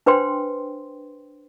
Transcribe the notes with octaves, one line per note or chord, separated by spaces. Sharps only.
D4 B4 C5 G5 C6